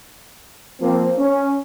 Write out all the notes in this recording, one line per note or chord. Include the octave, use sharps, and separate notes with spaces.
F3 A#3 C4
C#4